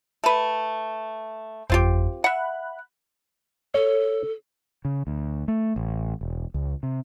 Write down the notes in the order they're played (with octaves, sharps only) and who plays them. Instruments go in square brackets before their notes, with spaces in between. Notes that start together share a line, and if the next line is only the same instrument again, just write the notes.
[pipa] A3 B4
[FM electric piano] G1 F2 [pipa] C4 F4 G4
[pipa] E5 F#5 [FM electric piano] B5 F#6
[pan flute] A4 [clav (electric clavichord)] C#5
[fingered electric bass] C#3
D2
A3
A1
E1
C#2
C3